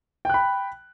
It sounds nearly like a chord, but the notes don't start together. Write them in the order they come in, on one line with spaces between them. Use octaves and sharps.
G5 F#6 B5